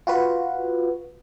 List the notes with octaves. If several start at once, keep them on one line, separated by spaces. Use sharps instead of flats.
F4 F#4 B4